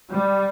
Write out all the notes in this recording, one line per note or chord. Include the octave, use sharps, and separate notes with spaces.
G3